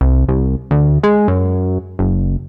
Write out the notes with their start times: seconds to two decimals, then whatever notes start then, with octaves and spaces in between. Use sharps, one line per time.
0.01 C2
0.28 C2
0.71 D2
1.03 G#3
1.28 F#2
1.99 F#1